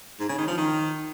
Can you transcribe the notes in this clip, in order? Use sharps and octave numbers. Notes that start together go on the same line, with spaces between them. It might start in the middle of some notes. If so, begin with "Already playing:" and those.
G#2
C#3
D#3
F3
D#3